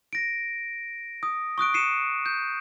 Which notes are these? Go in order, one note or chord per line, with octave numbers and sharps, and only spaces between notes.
A#6 D7
D#6
C#6 D#6 F#6 D7
C7 C#7 D#7 E7
G6